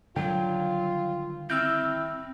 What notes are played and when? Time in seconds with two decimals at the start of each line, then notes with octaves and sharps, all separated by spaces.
0.16 D3 D#3 F#3 G3 F4 G5
1.50 C4 E4 E6 F6 G6